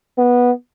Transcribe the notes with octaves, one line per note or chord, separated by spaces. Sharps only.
B3